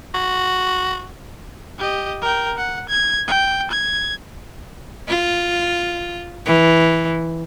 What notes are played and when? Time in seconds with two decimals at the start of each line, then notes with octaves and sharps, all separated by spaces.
0.14 F#4
1.79 G4 D#5
2.21 A#4 G5
2.57 F#5
2.89 G#6
3.28 G5
3.71 G#6
5.09 F4
6.46 E3